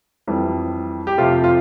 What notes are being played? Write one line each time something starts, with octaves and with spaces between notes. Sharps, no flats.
F2 E3 G3
G4
F2 C3 F3 A3 F4
F4